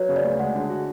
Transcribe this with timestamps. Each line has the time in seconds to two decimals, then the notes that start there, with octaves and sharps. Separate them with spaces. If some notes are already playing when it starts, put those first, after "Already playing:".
Already playing: F#3 B4 C#5
0.09 C#3
0.16 D5
0.24 D2
0.39 G#3 F#5
0.55 D3
0.70 F#4